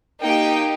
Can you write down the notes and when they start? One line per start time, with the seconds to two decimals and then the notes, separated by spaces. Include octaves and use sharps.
0.22 A#3 D#4 G4 G5